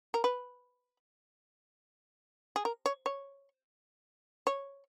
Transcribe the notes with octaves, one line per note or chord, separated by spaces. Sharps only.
A#4
B4
G#4
A#4
C#5
C#5
C#5